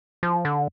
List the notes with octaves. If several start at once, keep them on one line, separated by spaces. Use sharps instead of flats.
F3
D3